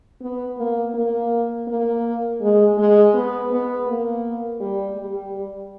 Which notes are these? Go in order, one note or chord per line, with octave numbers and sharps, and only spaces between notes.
B3
A#3
A#3
A#3
G#3
G#3
B3
B3
A#3
G3
G3